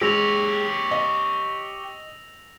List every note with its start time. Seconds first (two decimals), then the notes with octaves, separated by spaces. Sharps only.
0.01 G#3 G4 C#5 E6 A#6 F7
0.91 D#5